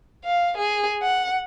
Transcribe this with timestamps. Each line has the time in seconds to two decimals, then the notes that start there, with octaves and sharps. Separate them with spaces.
0.24 F5
0.57 G#4
1.02 F#5